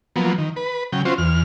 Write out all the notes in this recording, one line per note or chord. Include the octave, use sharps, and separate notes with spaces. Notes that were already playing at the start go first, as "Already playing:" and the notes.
F3 F#3 A#3 B3
D#3
B4
C#3 F#3 G5
C4 C#4 F4 F#4 C5
E2 F6